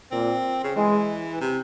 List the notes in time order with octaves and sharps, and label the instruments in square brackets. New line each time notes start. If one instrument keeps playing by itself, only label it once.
[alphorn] A#2 [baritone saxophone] C4
[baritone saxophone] C#3
[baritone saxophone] E3 [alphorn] G#3
[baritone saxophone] C3